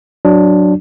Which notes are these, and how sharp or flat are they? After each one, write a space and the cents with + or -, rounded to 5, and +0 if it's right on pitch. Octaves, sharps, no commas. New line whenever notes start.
F#3 +0 D4 +0